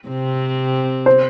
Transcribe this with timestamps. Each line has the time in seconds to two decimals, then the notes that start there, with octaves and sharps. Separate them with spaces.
0.08 C3 C4
1.06 C5